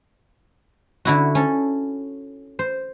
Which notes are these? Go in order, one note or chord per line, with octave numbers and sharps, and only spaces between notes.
D3 E4 F#4
C#4 A4
C5